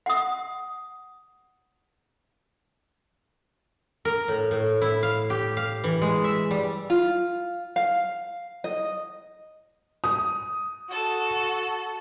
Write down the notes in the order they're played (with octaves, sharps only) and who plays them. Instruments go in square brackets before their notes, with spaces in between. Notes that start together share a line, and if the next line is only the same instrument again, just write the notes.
[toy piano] F#5 D#6
[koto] A#4
A2
A2
E4
F5
G4
F5
E3
G#3
E5
G3
[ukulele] F4
F5
D#5
[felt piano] D#6
[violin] F#4 A4